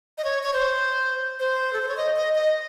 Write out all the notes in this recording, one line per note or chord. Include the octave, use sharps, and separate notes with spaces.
D#5
C#5
C#5
C5
C5
A4
C5
C#5
D#5
D#5
D#5